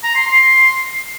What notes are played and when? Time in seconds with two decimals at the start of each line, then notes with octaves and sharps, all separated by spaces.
0.04 A#5
0.15 C6
0.27 C6